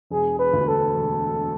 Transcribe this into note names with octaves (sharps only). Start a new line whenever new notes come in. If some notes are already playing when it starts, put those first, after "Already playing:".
E1 G#4
B4
D2
A4
E1